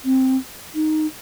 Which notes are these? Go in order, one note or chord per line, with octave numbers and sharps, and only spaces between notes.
C4
D#4